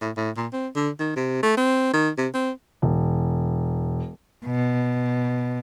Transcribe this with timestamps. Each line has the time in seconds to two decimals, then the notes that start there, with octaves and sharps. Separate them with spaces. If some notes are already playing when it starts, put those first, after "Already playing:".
0.01 A2
0.17 A2
0.37 A#2
0.53 C4
0.75 D3
0.99 D#3
1.16 C3
1.43 A3
1.57 C4
1.93 D#3
2.18 C3
2.34 C4
2.82 E1
4.45 B2